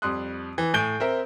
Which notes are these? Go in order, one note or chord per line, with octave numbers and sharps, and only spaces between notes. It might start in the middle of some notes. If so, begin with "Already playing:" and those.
F2 G3 C6 D#6 F#6
E3
A2 G#5 G6 D7 G7
C4 A#4 E5